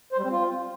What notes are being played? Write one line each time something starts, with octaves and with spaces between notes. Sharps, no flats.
C5
G3
C4
F4